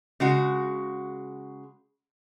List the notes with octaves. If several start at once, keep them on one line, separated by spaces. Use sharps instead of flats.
C#3 G#3 F#4